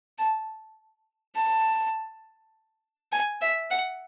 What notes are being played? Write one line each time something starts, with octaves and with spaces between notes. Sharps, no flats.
A5
A5
G#5
E5
F#5